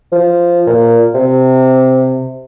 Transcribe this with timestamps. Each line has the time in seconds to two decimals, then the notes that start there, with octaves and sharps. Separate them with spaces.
0.12 F3
0.67 A#2
1.14 C3